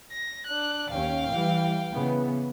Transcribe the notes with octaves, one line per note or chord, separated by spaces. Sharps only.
A#6
D4 F#6
D#2 C#4 F5 G5
E3 G3
C#3 E3 B3